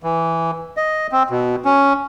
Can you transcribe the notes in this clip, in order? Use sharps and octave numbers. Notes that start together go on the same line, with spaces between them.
E3
D#5
C4
B2
C#4